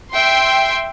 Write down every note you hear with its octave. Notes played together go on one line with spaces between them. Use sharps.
E5 G5 C6